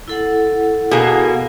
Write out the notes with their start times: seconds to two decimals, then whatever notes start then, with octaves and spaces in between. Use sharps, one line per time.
0.08 E4 A4 F#5
0.91 B2 A#3 G#4